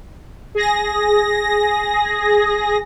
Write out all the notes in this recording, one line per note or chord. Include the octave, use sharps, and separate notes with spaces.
G#4 A#6